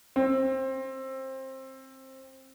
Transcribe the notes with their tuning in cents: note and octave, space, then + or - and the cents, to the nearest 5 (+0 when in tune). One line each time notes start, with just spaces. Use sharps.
C4 +20